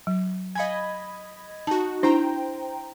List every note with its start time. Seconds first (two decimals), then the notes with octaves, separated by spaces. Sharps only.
0.07 F#3
0.55 D#5 F5 G#5 B5 G#6
1.67 D#4 F#4 A5
2.03 D4 E4 C5 G5 A#5